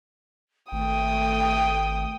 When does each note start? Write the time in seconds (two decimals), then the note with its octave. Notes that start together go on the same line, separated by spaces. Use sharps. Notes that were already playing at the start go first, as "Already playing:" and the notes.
0.72 G#1 A3 G5 D#6